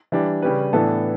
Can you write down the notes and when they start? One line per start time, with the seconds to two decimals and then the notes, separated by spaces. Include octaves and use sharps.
0.12 E3 G3 D4 G4
0.42 C#3 G3 C#4 G4 B4
0.73 A2 E3 B3 D4 A4